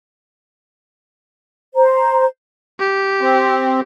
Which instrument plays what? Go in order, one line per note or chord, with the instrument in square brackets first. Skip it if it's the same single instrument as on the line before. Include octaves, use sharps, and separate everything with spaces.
[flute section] C5 A#5
[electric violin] G4
[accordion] C4